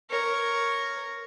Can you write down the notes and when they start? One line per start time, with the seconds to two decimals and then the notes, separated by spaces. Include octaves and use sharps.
0.11 A#4 C#5